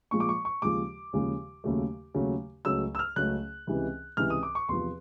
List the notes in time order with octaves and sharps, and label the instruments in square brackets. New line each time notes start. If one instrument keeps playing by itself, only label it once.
[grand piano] A#2 F3 G#3 C#6
D6
C#6
C#6
D#2 C#3 F3 G#3 D6
D#2 C#3 F3 G#3
D#2 C#3 F#3 A3
D#2 C#3 F#3 A3
C#2 C#3 F#3 A3 E6
E6
F6
C#2 C#3 F#3 A3 F#6
C#2 C3 E3
C#2 C3 E3 F6
D#6
D6
C#6
E2 C3 F3 C6